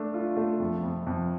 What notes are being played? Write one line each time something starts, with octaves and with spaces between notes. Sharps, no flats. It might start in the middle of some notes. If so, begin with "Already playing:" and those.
Already playing: A3 D4
F4
A3
F2
F2
F2